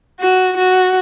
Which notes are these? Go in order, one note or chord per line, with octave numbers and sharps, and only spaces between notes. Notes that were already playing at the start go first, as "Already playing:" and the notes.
F#4
F#4